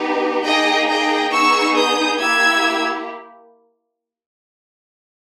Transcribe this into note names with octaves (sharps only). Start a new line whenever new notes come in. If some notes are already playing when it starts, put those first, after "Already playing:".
Already playing: B3 D#4 G4
A#3 D#4 G#4 D#5 G5
D#5 G5
B3 D#4 G#4 C#6 E6
D#6 G6
A#3 E4 G4 E6 G#6